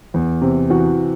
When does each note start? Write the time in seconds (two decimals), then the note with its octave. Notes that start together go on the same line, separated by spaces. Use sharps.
0.14 E2
0.41 C3
0.70 E3 F#4